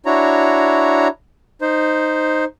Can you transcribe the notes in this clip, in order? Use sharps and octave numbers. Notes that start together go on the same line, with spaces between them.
D4 E4 F#4 C#5 A#5
D#4 C5